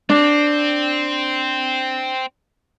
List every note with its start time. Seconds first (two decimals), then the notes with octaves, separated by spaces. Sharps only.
0.10 C4 D4